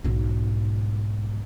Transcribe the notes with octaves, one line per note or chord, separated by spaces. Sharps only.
B1 G#2